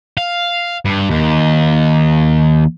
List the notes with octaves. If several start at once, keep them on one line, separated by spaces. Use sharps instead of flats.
F5
G2
D#2